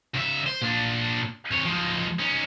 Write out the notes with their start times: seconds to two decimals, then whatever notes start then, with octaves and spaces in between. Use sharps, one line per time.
0.15 C#2 E5
0.47 C5
0.62 A#2 D4
1.51 C3 C#5
1.65 F3 G#3
2.20 C#4 D#4